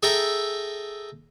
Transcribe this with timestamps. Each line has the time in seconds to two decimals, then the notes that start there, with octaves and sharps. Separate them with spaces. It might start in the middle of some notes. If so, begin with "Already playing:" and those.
0.03 G#4 A4 E5 G5 A#5